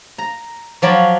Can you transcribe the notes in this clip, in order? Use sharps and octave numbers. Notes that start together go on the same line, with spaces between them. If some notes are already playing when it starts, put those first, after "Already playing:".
A#5
F3 F#3 D5 B5